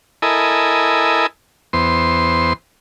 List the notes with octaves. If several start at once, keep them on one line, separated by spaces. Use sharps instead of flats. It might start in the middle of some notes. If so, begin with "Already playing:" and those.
E4 A4 A#4 D#5 G#5 B5
E2 B3 C5 C6